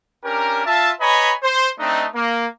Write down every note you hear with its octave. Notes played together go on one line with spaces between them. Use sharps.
C#4 D4 G4 A#4
F4 E5 A5
B4 C#5 D#5 G#5 A#5 B5
C5
A3 C4 D4 D#4
A#3